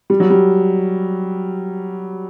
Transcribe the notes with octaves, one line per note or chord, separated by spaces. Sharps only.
G3
F#3
G3